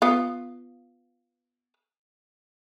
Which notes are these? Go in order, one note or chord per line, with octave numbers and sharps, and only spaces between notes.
B3 F4